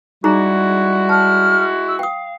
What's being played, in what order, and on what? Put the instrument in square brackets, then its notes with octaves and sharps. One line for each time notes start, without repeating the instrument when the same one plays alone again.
[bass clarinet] G3 [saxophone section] G#3 E4 F#4 [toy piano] D#4 G#4 A#5
[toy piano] A5 [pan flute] F6
[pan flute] E6
[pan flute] F5 [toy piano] G5 D#6